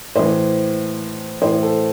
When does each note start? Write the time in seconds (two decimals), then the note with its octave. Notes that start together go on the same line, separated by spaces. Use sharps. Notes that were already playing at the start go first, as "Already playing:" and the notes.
0.15 A2 E3 C5
1.42 A2 E3 C5
1.63 A4